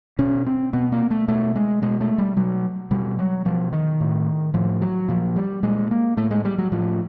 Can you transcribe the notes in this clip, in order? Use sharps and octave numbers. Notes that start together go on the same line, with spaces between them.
B2 C#4
C4
B2 B3
A#3
A3
B2 A3
G#3
B2 G#3
A3
G3
B2 F#3
B2 G3
F#3
B2 F3
D#3
A2
A2 F3
F#3
A#2 F3
G3
A#2 G#3
A#3
A2 A3
G#3
G3
F#3
A2 F3